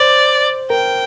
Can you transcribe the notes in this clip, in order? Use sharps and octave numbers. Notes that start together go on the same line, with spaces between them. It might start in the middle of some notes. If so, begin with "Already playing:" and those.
Already playing: C5 D5
A#4 G5